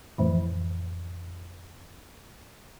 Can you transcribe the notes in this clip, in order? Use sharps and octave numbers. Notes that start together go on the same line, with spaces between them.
F2 A2 E3